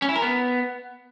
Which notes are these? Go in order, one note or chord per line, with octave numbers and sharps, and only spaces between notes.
C#4
E4
A#4
B3